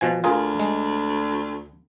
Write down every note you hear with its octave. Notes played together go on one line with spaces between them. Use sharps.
B2 F3 G#5
D2 F4 G#4 A#4
G#3